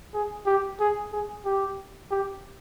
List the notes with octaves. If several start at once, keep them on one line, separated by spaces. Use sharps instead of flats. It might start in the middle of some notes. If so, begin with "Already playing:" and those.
G#4
G4
G#4
G#4
G4
G4